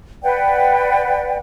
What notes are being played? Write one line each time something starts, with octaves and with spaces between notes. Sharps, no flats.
B4 D5 F#5 G5